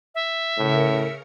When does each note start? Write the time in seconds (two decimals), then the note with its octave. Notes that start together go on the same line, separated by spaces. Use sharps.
0.15 E5
0.57 A2 C#3 A#4 C#7